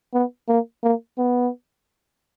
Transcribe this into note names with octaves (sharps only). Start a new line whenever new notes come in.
B3
A#3
A#3
B3